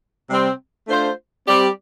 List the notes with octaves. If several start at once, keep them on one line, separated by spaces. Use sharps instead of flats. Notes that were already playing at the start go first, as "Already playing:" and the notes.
C3 G3 C4
A3 D4 F4 C5
G3 C4 G4 D5